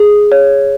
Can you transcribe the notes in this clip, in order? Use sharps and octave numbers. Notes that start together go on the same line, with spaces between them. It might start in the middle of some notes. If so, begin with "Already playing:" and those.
Already playing: G#4
C#5